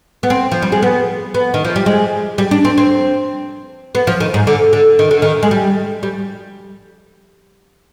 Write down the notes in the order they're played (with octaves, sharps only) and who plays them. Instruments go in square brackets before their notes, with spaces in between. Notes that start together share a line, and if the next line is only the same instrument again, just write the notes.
[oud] B3
C4
F3
G3
G#3
B3
B3
D#3
F3
G3
G#3
G3
D4
C4
C4
B3
F3
D#3
G#2
D3
D3
D#3
D3
D#3
G#3
G3
G3